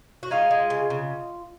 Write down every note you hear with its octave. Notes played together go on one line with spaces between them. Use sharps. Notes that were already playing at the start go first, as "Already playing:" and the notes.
F#4
G#3 D#4 F4
G#3
C#3
C#3